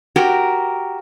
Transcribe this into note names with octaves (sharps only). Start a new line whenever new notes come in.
F#4 G4 A#4